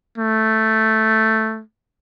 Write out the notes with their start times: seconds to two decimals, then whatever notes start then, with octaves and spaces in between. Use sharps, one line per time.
0.18 A3